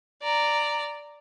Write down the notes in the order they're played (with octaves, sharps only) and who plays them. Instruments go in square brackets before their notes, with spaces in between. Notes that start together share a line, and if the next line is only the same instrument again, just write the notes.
[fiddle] D5 A#5